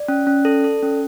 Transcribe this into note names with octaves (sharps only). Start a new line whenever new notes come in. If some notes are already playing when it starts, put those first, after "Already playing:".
Already playing: D5
C#4
C#4
A4
A4
C#4